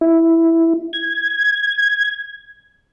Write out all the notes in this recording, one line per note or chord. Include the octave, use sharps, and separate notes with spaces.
E4
G#6